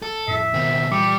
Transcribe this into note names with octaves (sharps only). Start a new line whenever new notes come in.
A4
F2 A2 E5 C7
B2 D#3 C4
A#2 E3 G3 D6 C#7